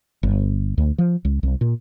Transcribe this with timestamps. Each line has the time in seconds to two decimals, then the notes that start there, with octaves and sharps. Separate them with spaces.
0.23 G1
0.78 D2
0.98 F3
1.25 C#2
1.43 C2
1.61 A#2